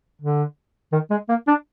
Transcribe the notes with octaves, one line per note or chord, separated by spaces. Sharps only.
D3
D#3
G#3
A#3
D4